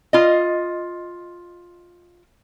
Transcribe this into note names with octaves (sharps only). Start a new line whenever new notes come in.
F4 D#5